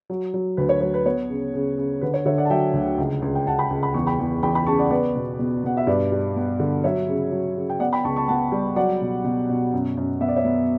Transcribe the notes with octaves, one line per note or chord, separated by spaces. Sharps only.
F#3
F#3
D2 B4
C#5
F#3 C#5
B4
B3 C#5
C#3
C#3
C#3
D3 B4
C#5
D3 C#5 E5
D5 F#5
A5
F#3 E5 G5
D2
C#2
C#2
G5
C#2 F#5 A5
G5 B5
C#2
B5
E2 C#6
G5 B5
E2
E2 G5 B5
G5 B5
C#3 A5 C#6
D5 F#5
B3 B4 D5
B2
B2
B2 F#5
E5
G2 B4 D5
G3
B3
D3
F#3 C#5 E5
C#3
F#3
C#3
G5
B3 D5 F#5
G5 B5
C#2 A5 C#6
A5 C#6
B3 F#5 A5
G3
F#3 D5 F#5
B2
B2
B2
F#2
F#2
B3 E5
D5
C#5 E5
B3